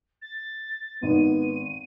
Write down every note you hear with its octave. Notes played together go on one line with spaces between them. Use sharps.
A6
G#1 B3 D#4 D#7